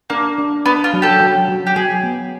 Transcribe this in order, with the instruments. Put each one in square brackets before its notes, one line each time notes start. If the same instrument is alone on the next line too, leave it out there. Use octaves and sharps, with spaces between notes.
[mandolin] A#3 [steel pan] D4
[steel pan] D4
[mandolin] B3 [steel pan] D4
[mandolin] F4
[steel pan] F#3
[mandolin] G4 A4
[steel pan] F#3
F#3
[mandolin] G4
[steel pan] F#3 [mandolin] G#4
[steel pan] B3